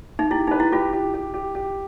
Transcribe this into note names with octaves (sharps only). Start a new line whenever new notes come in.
D#4
E4 G4
D#4 B4
E4
F4 G4
G4
G4
G4
G4